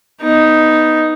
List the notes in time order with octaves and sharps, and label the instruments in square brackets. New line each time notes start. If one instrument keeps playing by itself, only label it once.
[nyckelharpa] B3 D#4